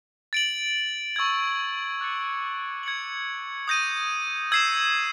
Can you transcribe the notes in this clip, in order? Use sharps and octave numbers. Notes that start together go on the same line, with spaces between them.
A6 D7 F#7
C#6 E6 G#6
D6 F#6 A6 C#7
G#6 C#7 F#7
D#6 G6 A#6 D#7
E6 G#6 C7 E7